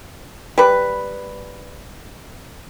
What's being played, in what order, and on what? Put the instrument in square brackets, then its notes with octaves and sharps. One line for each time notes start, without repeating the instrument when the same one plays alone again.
[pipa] G3 B4